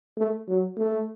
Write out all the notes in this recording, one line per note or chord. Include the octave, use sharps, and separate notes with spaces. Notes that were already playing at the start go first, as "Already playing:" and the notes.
A3
F#3
A3